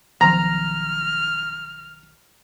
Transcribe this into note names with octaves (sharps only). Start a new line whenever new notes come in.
B1 D#3 F3 A#5 F6